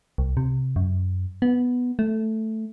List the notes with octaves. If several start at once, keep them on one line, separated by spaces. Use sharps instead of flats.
C2
C3
F#2
B3
A3